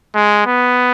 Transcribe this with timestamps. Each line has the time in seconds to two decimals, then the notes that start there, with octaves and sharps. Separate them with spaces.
0.15 G#3
0.46 B3